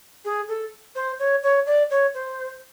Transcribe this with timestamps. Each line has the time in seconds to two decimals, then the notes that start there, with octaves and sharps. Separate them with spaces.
0.25 G#4
0.48 A4
0.95 C5
1.19 C#5
1.43 C#5
1.66 D5
1.90 C#5
2.14 C5